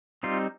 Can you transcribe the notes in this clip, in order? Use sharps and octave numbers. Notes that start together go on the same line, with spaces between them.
G3 C4 D#4 F4